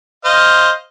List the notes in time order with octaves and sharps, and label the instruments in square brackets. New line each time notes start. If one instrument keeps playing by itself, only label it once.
[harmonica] C5 D#5 F5